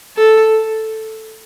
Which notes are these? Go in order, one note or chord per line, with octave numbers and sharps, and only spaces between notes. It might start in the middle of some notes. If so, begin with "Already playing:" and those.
A4